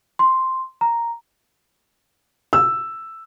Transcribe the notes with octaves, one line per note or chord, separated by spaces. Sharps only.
C6
A#5
E6